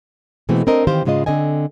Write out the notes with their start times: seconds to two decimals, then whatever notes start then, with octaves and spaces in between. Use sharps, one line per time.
0.49 B2 E3 G#3 A3 C4
0.67 C4 D4 A#4 D#5
0.87 D#3 E3 C4 G4 C5 F5
1.05 G#2 C#3 G#3 F4 D#5
1.26 D3 C4 D#5 G#5